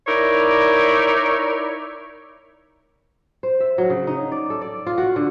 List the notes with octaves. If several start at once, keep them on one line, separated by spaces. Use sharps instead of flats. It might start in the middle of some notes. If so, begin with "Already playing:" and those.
D#4 E4 A#4 C#5 D5
C5
E5
F#3
C#3
D#4
D5
A4
D5
F4
F#4
D3